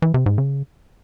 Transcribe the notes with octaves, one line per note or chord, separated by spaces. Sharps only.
E3
C3
G#2
C#3